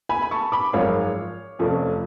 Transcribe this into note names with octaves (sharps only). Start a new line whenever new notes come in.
G#5 B5
B5
A5 C#6
B5 D6
G#1 F#2 F3 G#3 C#5 F5
F1 F2 F3 A3 C#4